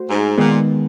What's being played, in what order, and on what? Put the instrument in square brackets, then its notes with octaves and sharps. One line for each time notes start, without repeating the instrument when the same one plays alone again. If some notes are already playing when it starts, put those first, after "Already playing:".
Already playing: [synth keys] A3 F#4 C5
[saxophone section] G#2
[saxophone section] A#2 [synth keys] D#3 G#3 B3